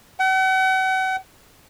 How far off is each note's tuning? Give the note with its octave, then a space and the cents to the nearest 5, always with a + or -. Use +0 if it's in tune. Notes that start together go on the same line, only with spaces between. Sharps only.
F#5 +40